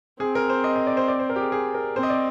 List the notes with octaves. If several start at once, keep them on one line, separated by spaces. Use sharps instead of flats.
C4 G#4
A#4
C5
D#5
D#5
D5
C5
D5
C5
A#4
G4
G#4
G#4
A#4
C4 C5
D#5
D5